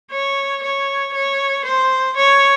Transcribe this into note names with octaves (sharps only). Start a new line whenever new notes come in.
C#5
C#5
C#5
C5
C#5